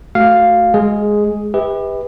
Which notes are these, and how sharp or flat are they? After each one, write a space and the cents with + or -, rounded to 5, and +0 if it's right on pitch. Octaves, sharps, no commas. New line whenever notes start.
A3 +0 F#4 +0 F5 +0
G#3 +0 G#4 +5
G4 +30 B4 +0 E5 -45